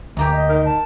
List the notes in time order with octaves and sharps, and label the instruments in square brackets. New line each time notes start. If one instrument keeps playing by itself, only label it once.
[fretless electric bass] D2 [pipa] G#3 A#3 G4
[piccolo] D#5
[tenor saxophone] D#3
[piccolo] A5